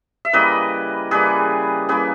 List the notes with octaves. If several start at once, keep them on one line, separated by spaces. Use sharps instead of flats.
E5
C#3 E3 G3 A#3 B4 D#5
C#3 E3 G3 A#3 G#4 B4
C#3 E3 G3 A#3 G#4 B4